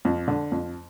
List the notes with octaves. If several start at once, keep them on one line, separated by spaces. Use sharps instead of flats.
F2
D3
F2